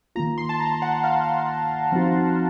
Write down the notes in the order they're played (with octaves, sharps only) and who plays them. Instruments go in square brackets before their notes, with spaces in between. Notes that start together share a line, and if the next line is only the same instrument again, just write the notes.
[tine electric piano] D#3 A#3 F4 [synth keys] A#5
[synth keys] C6
A5
A#5
F#5
F5
[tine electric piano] F3 C4 D#4 F#4